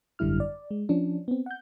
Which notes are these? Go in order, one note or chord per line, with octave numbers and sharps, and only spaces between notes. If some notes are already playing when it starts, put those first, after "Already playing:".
G#1 F#2 D3 G3 E4 F6
D5
G#3
F3 C#4 D4
B3 C4
F#5 G6